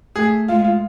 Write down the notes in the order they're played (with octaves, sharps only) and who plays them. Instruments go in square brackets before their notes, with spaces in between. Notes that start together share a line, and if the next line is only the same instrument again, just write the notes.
[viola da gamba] A3 [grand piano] G#4
[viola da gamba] G#3 [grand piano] F4
[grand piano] F4